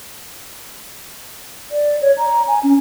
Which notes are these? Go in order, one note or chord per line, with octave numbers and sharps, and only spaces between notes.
D5
C#5
A#5
G#5
C#4